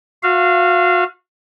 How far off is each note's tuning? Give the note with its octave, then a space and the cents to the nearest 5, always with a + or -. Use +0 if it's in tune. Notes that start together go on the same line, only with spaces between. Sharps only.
F#4 -35 F5 -25